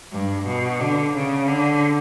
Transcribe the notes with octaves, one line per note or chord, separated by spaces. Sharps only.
G2
B2
D3
C#3
D3